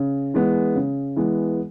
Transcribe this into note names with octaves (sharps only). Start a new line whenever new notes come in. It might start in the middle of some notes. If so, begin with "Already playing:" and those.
Already playing: C#3
E3 G#3 B3
C#3
E3 G#3 B3